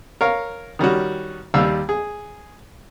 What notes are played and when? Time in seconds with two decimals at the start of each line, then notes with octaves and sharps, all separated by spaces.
0.21 A#4 C#5 F5
0.79 D#3 G3 C#4 F#4
1.54 D#2 G3 F5 E6
1.89 G#4